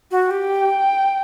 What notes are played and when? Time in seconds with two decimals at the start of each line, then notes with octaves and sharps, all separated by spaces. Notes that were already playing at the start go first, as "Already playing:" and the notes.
0.11 F#4
0.31 G4 G5